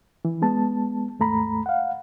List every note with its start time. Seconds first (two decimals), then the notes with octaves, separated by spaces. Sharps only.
0.25 E3
0.42 G#3 B3 A5
1.19 D#2 G#2 A3 A#5 B5
1.66 F5 F#5